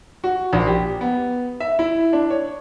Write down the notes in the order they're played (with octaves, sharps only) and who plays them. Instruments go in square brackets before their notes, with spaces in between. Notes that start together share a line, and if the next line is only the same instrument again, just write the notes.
[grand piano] F#4
A#1
G4
B3
E5
E4
D4
C#5